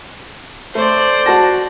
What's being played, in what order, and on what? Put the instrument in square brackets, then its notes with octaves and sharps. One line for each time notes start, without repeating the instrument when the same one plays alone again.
[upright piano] A3 [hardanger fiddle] C5 D5
[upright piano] F#4 A5 A#6